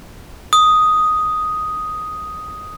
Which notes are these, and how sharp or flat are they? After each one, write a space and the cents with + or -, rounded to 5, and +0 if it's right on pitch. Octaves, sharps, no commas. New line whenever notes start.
D#6 +5